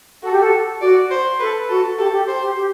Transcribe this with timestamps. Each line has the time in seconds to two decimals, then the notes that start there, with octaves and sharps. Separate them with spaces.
0.23 F#4 A4
0.32 G4
0.40 A4
0.81 F#4 D5
1.10 C5
1.40 A4 B4
1.69 F#4 A4
1.98 G4 A4
2.09 A4
2.13 G4
2.27 C5
2.42 G4
2.57 G4